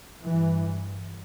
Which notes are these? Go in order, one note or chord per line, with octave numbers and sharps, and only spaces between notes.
G2 E3